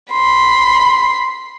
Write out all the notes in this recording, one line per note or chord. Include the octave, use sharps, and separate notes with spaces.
B5 C6